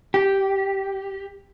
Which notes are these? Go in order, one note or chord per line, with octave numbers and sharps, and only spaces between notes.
G4